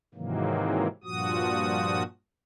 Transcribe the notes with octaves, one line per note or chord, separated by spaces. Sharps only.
G#2 C3 D#3 E3 F#3 A#3
G2 A#2 F3 F#4 D#6